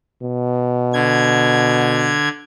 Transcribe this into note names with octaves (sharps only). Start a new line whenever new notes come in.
B2
D3 G#6